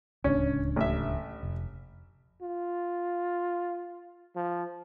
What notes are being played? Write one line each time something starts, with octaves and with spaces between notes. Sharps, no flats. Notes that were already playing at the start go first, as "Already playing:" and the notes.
D1 C#2 C#4 D4
A1 E5
F1
F4
F3